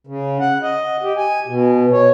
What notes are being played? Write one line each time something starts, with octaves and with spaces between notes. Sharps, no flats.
C#3
F#5
D#5
G4
G#5
B2
C#5